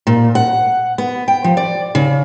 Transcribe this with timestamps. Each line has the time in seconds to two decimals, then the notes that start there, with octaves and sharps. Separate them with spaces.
0.07 A#2
0.35 F#5
0.98 B3
1.28 G5
1.44 F3
1.57 D5
1.95 C#3